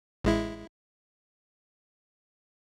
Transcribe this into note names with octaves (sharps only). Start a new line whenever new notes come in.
A1 G#3 E4